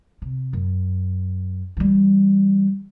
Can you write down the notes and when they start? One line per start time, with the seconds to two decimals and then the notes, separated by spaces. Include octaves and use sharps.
0.22 C3
0.53 F#2
1.77 E3 G3